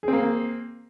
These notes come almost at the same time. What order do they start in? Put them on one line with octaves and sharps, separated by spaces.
G#4 C4 A#3